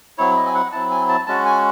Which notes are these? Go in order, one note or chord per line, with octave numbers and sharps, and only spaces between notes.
F#3 C4 E4 C#5
D#5
G#5
F#5
F#3 C4 E4 A5
G#5
A5
G#3 C#4 F#4 A5
G#5